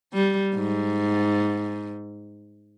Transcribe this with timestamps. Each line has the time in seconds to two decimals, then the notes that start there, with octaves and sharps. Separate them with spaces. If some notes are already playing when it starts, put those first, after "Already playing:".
0.13 G3
0.55 G#2